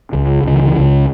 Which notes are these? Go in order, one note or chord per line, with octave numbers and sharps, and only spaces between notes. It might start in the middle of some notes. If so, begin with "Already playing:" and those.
C#2 C#3
C#2 C#3
E3
E3
C#2 C#3